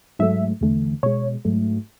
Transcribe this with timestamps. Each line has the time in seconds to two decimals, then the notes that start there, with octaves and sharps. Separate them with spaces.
0.19 G#2 F#3 A3 E5
0.61 E2 D3 A3
1.03 B2 G#3 C#5
1.45 G#2 F#3 A3